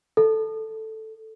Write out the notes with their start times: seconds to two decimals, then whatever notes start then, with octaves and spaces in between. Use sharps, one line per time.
0.17 A4